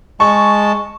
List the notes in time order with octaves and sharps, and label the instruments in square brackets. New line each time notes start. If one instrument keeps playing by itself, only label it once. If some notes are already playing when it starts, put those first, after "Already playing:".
[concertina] G#3 A5 [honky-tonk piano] C#6